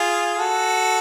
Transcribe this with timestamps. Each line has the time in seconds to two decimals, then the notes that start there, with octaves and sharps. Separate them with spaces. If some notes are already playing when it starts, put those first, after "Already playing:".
Already playing: F4 G#4
0.38 F#4 A4